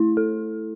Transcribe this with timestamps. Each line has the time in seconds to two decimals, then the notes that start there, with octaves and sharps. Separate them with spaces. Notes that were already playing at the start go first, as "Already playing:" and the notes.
Already playing: A3 E4
0.17 A4